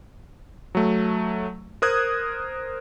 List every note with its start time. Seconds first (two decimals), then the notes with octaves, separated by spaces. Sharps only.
0.75 F#3 A3
1.82 A#4 C5 D#6 F#6 G#6